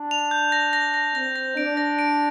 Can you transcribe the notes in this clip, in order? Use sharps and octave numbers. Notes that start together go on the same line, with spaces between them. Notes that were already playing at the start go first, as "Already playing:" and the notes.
Already playing: D4
F7
G6
A#6
A#6
A#6
C4 A#6
A#6
D4 D7
A#6
D7